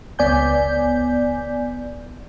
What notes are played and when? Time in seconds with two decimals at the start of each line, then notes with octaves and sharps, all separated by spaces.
0.19 C#2 B3 D5 G#5 G6